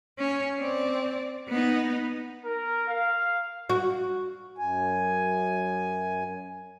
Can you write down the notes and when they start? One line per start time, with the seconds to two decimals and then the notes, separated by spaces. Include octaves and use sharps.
0.18 C#4
0.59 C4 D5
1.48 B3 D#4
2.44 A#4
2.87 F5
3.70 F#4
4.58 F#2 G#5